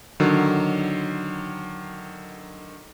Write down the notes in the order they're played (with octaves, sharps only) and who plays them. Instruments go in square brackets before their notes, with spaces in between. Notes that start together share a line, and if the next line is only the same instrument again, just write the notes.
[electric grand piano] D3 D#3 F#3